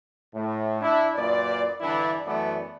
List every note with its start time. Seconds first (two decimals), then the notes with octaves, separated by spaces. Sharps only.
0.34 A2
0.81 D4 E4
1.16 F#2 A#2 B4 D5
1.81 G2 D3 E3 D4 E4 D5
2.26 F#2 E3 A3 B3 D5